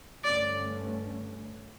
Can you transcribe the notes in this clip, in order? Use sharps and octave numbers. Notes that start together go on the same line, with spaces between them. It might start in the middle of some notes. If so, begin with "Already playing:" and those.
G2 D3 A3 C#4 D5